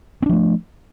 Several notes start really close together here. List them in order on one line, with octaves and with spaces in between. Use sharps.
C4 D4 F3 A3